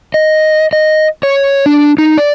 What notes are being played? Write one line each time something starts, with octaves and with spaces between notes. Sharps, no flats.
D#5
D#5
C#5
D4
D#4
D5